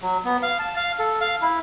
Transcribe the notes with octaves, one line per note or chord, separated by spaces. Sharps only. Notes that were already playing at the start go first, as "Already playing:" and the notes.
F#3
B3
F5
A5
F5
A4
F5
E4